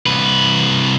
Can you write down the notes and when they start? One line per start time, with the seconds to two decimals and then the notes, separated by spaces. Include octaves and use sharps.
0.06 C2 B4